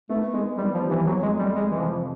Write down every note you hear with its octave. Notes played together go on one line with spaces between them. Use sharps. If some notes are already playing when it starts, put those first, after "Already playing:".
A3 B3
G#3 B3
G3 B3
F3
G3
E3
F2 F#3
G#3
A3
G3
G#3 A3
E3
C3 F3